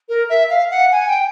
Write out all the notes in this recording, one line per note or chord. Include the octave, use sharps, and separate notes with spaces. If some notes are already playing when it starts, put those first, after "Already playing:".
A#4
E5
F5
F#5
G#5
G5